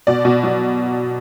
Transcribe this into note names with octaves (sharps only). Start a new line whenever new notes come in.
B2 D5
B2
F#3